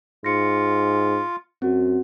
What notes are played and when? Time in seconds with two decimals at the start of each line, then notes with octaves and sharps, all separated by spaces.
0.25 G#2 F4 A#6 C#7
1.62 F#2 C4 F#4